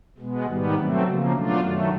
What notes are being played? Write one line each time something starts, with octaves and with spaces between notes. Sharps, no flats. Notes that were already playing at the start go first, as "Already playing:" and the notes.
B2 G#3 B3
G#2 D#3 G3 B3
B2 F#3 A3 C4
C#3 F3 A#3
B2 F#3 A3 D4 F4
F#2 D#3 F#3 A3